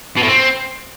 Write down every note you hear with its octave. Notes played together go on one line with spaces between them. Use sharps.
B2
A2
C4